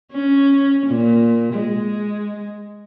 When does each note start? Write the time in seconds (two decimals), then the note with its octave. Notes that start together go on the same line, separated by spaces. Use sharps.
0.13 C#4
0.86 A#2
1.53 G#3